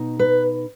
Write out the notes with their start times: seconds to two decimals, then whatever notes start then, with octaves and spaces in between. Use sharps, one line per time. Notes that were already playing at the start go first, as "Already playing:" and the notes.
Already playing: B2 D#4
0.19 B4